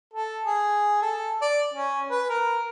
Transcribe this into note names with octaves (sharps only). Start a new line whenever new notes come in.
A4
G#4
A4
D5
C#4
B4
A#4